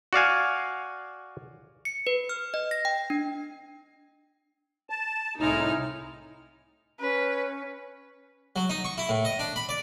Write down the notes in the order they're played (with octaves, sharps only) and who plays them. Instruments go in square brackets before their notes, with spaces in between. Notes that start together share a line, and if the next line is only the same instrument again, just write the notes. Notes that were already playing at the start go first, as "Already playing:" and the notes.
[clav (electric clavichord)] F#4 D5 F5 G#5
[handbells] C#7
B4
F6
D#5
A#6
G5
D4
[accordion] A5
[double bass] C2 E4 [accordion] A2 [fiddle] G#3 F6 [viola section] D#4
[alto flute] C#4 [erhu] B4
[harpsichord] F#3
D#4
C#6
E4
A2
D#5
D4
B5
D5